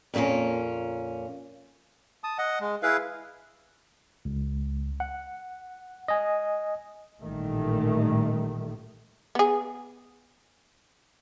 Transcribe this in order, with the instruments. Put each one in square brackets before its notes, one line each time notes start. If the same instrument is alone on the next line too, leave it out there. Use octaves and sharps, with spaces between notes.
[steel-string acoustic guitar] F2 A#2 A3 A#3 C#4
[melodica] A5 D#6
D#5 F#5
G#3
E4 G#4 B4 F5
[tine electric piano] C#2
F#5
D#5 G#5
[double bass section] A1 A#2 D#3 G3 A3
[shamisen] B3 G#4